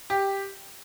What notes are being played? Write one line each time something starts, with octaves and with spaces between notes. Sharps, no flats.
G4